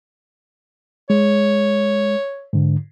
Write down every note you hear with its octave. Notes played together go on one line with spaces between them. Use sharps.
G#3 C#5
G#2 D3